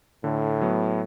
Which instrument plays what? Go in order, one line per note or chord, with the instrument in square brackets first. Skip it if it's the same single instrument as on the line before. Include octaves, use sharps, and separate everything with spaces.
[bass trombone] A2 [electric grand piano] D3
[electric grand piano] F#3 B3